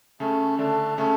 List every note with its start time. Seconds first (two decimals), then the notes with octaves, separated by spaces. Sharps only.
0.20 C#3 A3 C#4
0.59 D3 A3 D4
0.98 C#3 A3 C#4